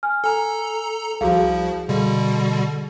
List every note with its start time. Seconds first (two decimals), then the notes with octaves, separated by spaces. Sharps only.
0.03 G#5 F6
0.24 A4 G#5 A#5
1.21 C2 F3 F#4 G#4 F5
1.89 B2 D3 G3 G#4